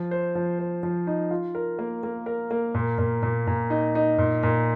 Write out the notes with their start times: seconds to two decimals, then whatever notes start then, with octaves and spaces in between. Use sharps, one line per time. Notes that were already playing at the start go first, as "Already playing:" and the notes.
Already playing: F3
0.11 C5
0.35 F3
0.59 C5
0.83 F3
1.07 D#4
1.31 F4
1.55 A#4
1.79 A#3
2.03 A#3
2.26 A#4
2.51 A#3
2.74 A#2
2.98 A#2
3.23 A#2
3.47 A#2
3.70 D#4
3.95 D#4
4.18 A#2
4.43 A#2